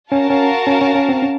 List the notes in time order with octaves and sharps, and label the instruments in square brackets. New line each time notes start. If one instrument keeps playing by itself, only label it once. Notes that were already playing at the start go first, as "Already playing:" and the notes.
[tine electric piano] C#4 [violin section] F#4 A#4 F5 A5
[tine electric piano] C#4
C#4
C#4
C#4
C4
C#4